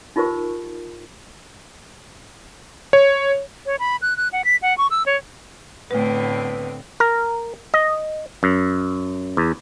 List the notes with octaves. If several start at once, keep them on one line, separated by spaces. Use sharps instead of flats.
D#4 F4 G4 A#4 C5 C#6
C#5
C#5
B5
F#6
F#6
F#5
B6
F#5
C#6
E6
C#5
A2 D3 A3 B3 C4 B4
A#4
D#5
F#2
E2